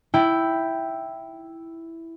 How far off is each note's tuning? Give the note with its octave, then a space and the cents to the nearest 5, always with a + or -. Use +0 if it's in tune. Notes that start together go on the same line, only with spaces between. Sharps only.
E4 +0 G5 +0